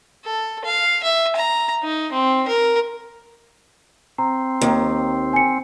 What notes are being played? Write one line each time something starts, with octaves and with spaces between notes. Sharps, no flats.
A4
F5
E5
A#5
D#4
C4
A#4
C4 A#5
D#2
G#5 C#7